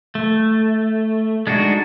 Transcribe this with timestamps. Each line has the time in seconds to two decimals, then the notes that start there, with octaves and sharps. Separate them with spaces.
0.15 A3
1.47 G#3 D4 D#4 F#4